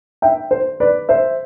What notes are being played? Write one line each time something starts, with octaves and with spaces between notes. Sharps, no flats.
E5 G5
C5
B4 D5
C5 E5